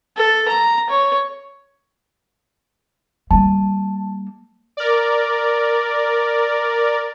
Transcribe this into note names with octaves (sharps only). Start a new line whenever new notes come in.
A4
A#5
C#5
G3 A#3 A5
A#4 D5